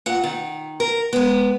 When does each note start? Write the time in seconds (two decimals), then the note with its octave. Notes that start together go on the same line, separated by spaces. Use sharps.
0.06 A#2 F#5
0.24 D#3
0.80 A#4
1.13 G#3 B3